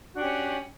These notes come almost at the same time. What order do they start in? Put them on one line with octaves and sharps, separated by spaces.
F#4 D4 G4 C#4